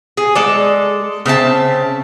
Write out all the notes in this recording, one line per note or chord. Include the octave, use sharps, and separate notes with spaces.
G#4
G#3 A4 D5
C#3 C4 E5 A5